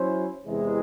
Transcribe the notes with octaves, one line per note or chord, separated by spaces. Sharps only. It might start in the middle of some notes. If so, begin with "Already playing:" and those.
Already playing: F#3 C#4 E4 C5
E2 C3 E3 G#3